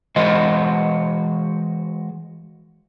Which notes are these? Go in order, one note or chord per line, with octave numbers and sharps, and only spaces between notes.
E3 G#3 F#4 C5 D#5